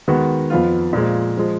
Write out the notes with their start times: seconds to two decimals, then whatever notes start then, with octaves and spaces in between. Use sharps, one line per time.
0.08 D#3 G#3 B3 F#4
0.50 F2 F3 B3 F4
0.93 A#2 F3 G#3
1.37 F3 G#3